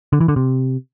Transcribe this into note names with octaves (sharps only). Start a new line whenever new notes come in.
D3
E3
D3
C3